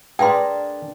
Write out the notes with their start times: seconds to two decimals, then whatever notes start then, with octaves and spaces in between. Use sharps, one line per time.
0.19 D4 G#4 A#4 B4 G5 A#5 C6